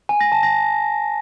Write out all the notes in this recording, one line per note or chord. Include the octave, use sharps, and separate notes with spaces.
G#5
A#6
A5
A#6